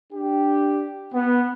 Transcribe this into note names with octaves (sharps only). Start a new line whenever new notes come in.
D4 G4
B3